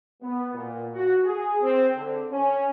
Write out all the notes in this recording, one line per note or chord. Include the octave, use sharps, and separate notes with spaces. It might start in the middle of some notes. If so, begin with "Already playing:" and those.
B3
A#2
F#4
G#4
C4
D3
C#4